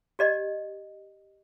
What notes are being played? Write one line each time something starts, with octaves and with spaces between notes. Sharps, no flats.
G4 D5 D#5